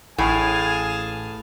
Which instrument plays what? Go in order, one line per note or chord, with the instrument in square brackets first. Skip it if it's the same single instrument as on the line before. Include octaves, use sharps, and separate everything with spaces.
[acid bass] A1 [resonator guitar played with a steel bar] A2 [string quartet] G#4 F5 A5 [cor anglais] G#5